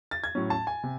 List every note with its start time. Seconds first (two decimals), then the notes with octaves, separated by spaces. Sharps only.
0.11 A6
0.24 G#6
0.35 A2 F#3 C#4
0.50 A5
0.67 G#5
0.83 C3